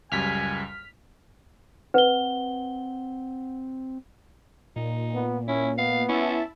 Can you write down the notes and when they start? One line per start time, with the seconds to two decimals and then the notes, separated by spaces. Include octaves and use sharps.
0.12 C#2 F#2 G3 G#5 F6 B6
1.94 C4 B4 F#5 G7
4.76 A#2 D#4
5.15 B3
5.48 C#4 E4
5.78 B3 F5
6.09 C#4 E4 E5 A5